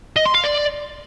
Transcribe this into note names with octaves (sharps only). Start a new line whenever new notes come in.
D#5
C6
F5
D5